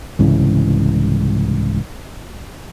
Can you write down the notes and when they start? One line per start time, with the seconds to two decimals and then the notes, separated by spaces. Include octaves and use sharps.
0.19 C2 G#2 C#3 E3